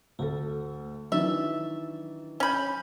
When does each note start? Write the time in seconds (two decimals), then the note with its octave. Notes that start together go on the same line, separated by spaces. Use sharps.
0.19 D2 A3 A4
1.12 D#3 E3 F#3 D4 E5
2.40 C#4 G#5 B5 G6